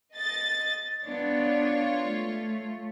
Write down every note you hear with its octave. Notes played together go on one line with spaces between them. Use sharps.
D#5 A6
B3 D4 F4 C#5
A3